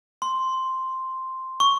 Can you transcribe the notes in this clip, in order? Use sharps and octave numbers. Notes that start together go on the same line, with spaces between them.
C6
C#6